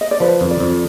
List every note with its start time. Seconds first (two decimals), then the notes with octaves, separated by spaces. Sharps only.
0.01 D#5
0.11 D5
0.20 F3 B4
0.41 F2
0.51 D5
0.60 F2